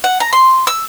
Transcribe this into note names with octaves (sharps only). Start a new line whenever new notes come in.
F#5
A#5
C6
E6